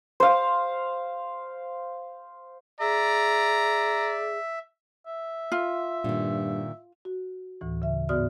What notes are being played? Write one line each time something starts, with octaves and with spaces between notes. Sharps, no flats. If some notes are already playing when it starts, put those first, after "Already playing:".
C5 F5
G#4 D5 E5 A#5
E5
F4
G2 A#2 D#3
F#4
D2 A2 E3
C#3 E5
G#2 B3 F#4 D5 D#6 F6